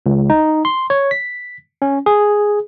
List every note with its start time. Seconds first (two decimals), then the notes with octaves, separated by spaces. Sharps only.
0.06 C#2
0.30 D#4
0.65 C6
0.90 C#5
1.11 B6
1.82 C#4
2.06 G#4